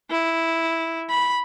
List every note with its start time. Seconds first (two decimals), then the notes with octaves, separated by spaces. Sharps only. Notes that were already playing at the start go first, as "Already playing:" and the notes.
0.11 E4
1.10 B5